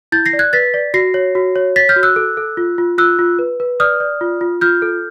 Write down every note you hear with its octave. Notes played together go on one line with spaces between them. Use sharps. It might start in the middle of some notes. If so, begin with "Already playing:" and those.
E4 G6 A6
A#6 C7
D5
F#6 G#6
B4 A6 B6
D5
F#4 A#6 C7
C#5
F#4
C#5
C#5 A6 B6
F6 G6
F#4
E6 F#6
A4
A4
F4
F4
F4 E6 F#6
F4
B4
B4
D5 D#6 F6
D5
F4
F4
F4 F6 G6
A4